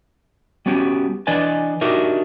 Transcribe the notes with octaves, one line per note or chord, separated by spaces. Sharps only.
G3 B3 C#4 F#4 G4
E3 D4 B4 D5 D#5 G#5
D4 D#4 F#4 G4 A#4 E5